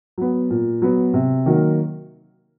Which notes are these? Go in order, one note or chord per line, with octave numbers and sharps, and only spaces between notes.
F#3 B3
A#2
F#3 B3
C3
D#3 F#3 A#3